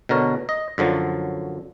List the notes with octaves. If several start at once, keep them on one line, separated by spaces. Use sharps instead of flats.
B2 D3 A#4 C#5
D#5
F#2 D3 F3 F#3